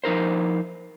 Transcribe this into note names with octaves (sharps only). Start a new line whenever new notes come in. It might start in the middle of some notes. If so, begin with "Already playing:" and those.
F3 D#4 A#4 C5